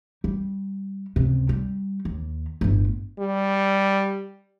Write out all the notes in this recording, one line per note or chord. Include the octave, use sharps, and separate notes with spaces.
G3
C#2 C3
G3
D#2
G1 A2
G3